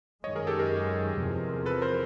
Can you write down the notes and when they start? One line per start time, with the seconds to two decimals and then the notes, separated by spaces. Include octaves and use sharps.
0.23 F#2 D#3 G#3 C#5 D#5
0.35 G#4 A#4
0.47 G4 A4
0.59 G#4 A#4
1.18 E2 C3 F3
1.66 A4 B4
1.81 A#4 C5